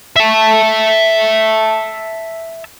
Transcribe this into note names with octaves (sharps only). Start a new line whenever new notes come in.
E5 A5